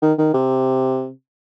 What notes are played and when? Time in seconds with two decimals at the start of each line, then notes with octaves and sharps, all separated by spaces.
0.02 D#3
0.18 D#3
0.34 C3